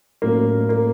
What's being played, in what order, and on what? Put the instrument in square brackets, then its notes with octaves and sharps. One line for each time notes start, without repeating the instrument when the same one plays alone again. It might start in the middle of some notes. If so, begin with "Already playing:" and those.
[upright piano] A2 F#3 A3 C#4 [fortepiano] A#3
[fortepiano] A#3